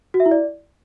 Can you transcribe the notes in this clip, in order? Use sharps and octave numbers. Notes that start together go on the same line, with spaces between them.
F#4
E5
E4
D5